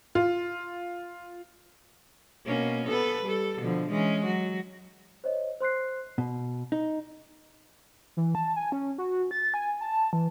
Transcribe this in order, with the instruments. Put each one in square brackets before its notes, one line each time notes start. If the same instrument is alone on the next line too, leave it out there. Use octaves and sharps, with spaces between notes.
[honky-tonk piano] F4
[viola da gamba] B2 A#3 C#4
B3 A4 B4
G3 A4
B2 D3 F3
E3 G#3 C#4
F#3 F#4
[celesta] C5 C#5 D#5
C5 C6 F#6 C7
[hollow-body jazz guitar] B2
D#4
[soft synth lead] E3
A5
G#5
C#4
F#4
A6
G#5
A5
E3